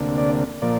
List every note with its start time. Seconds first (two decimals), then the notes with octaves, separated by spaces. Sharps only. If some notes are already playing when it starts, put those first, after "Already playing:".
Already playing: D2 C3 A#3 D4
0.18 D5
0.62 A#2 F3 A#3 D5